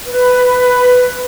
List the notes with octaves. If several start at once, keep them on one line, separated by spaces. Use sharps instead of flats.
B4